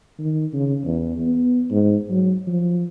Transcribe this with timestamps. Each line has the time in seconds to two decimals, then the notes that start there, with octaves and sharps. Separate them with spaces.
0.19 D#3
0.54 C#3
0.84 E2
1.21 B3
1.71 G#2
2.11 F#3
2.47 F3